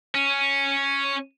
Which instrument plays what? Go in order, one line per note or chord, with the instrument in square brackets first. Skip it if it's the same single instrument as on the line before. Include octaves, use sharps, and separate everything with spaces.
[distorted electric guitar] C#4